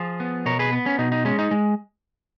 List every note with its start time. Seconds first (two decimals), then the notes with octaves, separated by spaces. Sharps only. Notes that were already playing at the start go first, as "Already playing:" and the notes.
Already playing: F3 F4 G#4
0.20 B3
0.46 B2 A#4 C#5
0.59 G#4 B4
0.73 B3
0.86 C#4
0.99 B2 D#4
1.12 D#4
1.25 G#3 C#4
1.39 D#4
1.51 G#3